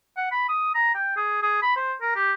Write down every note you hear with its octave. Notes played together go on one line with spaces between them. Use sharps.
F#5
B5
D#6
A#5
G5
G#4
G#4
B5
C5
A#4
G4